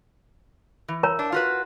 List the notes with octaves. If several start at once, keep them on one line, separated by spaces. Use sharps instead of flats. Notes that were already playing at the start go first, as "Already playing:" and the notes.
E3
A#4 C#5 A#5
D4
F4 F#4 B4